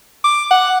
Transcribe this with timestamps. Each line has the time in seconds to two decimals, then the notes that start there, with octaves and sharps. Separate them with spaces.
0.24 D6
0.51 F#5